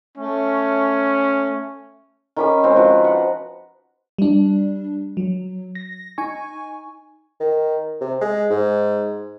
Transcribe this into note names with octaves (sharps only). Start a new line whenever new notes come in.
A3 C#4
D#3 C#4 B5 D6
G#3 C4 F#4
F3 F#4 B4
F#5
G3 D4
F#3
A#6
D#4 G#5 C#6
D#3
C3
G#3
G#2